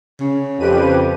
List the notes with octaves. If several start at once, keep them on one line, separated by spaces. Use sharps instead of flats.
C#3
F2 G4 B4 D#7